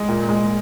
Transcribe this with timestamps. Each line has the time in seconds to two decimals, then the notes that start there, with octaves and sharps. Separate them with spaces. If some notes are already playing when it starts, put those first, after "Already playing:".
Already playing: G#3
0.09 A#2
0.29 G#3